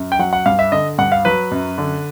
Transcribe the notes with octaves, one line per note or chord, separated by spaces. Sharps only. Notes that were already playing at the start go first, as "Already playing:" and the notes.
Already playing: F#2
G5
F#3 F#5
F#5
G2 F5
E5
D3 D#5
G2 F#5
F5
F#3 B4
F#2
D3